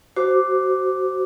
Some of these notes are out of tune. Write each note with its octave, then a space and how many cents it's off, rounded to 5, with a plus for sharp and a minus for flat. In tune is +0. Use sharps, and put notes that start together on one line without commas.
F#4 +25 C5 +0 D6 +0